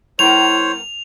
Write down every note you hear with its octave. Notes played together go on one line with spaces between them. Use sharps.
G3 B3 E4 A#4 C5 C#5 F7